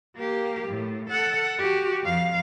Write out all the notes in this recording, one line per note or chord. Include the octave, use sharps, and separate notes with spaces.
A#3 G4
A2
A4 F#5
F#4 G4
F2 F5